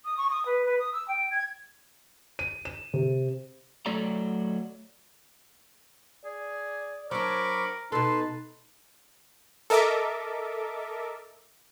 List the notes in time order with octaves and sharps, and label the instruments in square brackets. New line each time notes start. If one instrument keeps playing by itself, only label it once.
[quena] D#6
C#6
D#6
B4
B4
D#6
E6
G5
G#6
[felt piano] D#7
E7
C3
[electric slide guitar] F#3 A3 A4 D5 A#5
[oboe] G#4 [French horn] D5
[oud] F#3 D4 [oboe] A#4 [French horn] C5 [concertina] B5 C#6 D6
[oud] B2 A4 [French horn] D#4 [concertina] B4 A5 [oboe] C6
[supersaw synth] A4 A#4 D#5 E5 D6